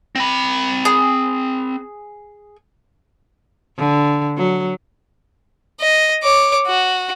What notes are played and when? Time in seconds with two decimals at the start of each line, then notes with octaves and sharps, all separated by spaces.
0.16 C4 B5
0.85 G#4
3.77 D3
4.37 F#3
5.81 D#5
6.23 C#5 D6
6.67 F#4